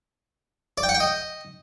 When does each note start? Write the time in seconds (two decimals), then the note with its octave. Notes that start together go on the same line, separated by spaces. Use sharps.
0.78 D5
0.83 G5
0.89 F#5
0.95 G5
1.00 D#5